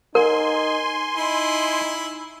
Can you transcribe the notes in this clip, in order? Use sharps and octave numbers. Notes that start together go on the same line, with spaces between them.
D#4 A#4 G#5 C6
D#4 E4